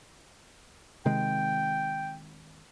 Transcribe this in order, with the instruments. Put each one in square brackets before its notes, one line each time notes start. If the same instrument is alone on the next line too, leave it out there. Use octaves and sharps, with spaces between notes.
[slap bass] C3 D#3 G#3 [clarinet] G5